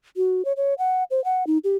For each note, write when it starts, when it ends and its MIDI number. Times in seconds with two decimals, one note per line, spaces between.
0.17 0.45 66
0.45 0.53 73
0.57 0.74 73
0.78 1.04 78
1.11 1.23 72
1.24 1.46 78
1.47 1.58 63
1.64 1.77 67